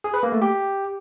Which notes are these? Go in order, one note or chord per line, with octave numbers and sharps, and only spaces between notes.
G#4
B4
A#3
A3
G4